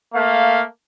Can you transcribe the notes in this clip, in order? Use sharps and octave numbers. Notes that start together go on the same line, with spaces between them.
A3 A#3 F5